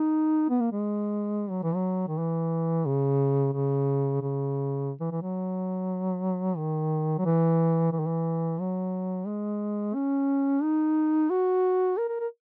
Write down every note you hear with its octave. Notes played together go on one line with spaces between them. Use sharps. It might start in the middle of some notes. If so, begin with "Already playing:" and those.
Already playing: D#4
B3
A#3
G#3
F#3
E3
F#3
D#3
E3
C#3
C#3
C#3
E3
E3
F#3
D#3
F#3
E3
E3
D#3
E3
F#3
G#3
C#4
D#4
F#4
A#4
A#4
A#4